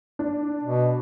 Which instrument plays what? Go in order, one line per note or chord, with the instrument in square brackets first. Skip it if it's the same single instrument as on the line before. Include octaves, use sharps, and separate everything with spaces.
[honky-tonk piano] D4
[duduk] B2